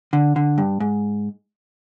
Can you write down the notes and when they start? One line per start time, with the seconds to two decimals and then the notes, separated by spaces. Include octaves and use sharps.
0.13 D3
0.36 D3
0.58 G2
0.80 G#2